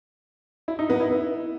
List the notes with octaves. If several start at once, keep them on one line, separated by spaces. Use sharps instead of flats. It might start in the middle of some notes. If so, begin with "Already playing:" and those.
E4
D#4
B3
E4